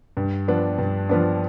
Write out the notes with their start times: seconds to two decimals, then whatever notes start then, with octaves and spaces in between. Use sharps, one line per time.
0.17 G2
0.48 F3 B3 D4
0.78 G2
1.09 F3 B3 D4